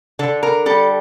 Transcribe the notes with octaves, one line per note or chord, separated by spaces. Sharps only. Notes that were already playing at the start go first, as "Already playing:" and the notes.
D3 A4
A#4
G3 A4